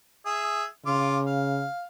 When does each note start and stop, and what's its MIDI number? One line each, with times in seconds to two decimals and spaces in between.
0.26 0.64 68
0.26 0.64 76
0.86 1.66 49
0.86 1.19 65
0.86 1.19 86
1.27 1.85 77